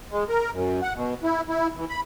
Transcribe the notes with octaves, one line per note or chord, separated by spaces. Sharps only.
G#3
A#4
F#2
F#5
B2
E4
E4
E3
B5